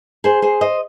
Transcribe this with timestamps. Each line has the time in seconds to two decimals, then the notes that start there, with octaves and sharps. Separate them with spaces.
0.24 G#4 C5
0.42 G#4 C5
0.61 C5 D#5